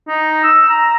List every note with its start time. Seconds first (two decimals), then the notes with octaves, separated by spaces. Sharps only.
0.08 D#4
0.44 E6
0.69 A#5